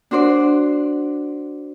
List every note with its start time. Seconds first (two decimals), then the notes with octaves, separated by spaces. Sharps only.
0.11 D4 F#4 C5 D5